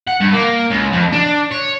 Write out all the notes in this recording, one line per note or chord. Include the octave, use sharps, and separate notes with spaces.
F#5
G2
A#3
C#2
F2
D4
C#5